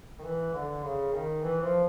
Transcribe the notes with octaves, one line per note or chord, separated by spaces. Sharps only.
D#3
E3
D3
C#3
D#3
E3
F3